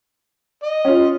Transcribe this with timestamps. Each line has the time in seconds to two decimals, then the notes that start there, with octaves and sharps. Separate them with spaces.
0.63 D#5
0.85 C#4 F4